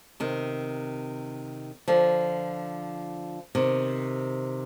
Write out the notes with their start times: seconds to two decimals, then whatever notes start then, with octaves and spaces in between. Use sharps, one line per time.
0.20 C3 D#3
1.88 D3 F3
3.55 C3 D#3